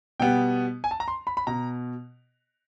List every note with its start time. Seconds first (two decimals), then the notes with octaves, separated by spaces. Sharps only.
0.20 B2 G3 B3 G5
0.84 G#5
0.91 A5
1.00 A#5
1.08 C6
1.27 B5
1.37 B5
1.47 B2 A#5